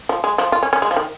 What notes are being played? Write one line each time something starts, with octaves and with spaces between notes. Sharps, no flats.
F3
G#3
F3
F4
C#4
C#4
G#3
F3
D#3